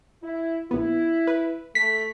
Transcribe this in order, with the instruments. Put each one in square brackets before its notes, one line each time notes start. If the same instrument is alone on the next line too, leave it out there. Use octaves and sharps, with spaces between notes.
[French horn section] E4
[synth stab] A#1 B3 [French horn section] E4
[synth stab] B4
[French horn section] A3 [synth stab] B6